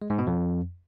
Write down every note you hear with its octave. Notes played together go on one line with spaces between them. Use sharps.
G#3
G#2
B2
F2